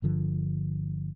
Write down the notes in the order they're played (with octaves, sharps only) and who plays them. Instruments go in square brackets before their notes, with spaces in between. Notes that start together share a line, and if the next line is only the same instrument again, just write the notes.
[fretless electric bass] G1 G2 D3 F3